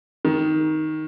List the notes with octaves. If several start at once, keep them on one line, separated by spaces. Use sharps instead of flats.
D#3